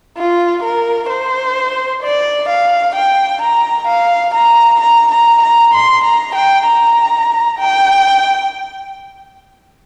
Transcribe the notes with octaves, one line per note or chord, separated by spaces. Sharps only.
F4
A#4
C5
D5
F5
G5
A#5
F5
A#5
A#5
A#5
A#5
C6
A#5
G5
A#5
G5